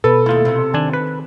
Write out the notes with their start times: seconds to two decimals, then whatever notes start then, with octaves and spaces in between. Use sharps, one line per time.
0.04 B2 A4 B4
0.26 D#2 A3 E4 F4
0.45 C3
0.74 D#3 D4 G#5
0.93 B4